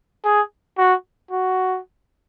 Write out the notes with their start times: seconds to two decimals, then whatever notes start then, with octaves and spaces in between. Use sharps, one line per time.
0.25 G#4
0.78 F#4
1.31 F#4